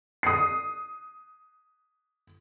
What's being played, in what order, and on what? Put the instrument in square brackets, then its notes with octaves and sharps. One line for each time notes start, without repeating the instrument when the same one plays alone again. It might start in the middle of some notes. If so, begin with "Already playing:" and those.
[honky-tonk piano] D#6 C7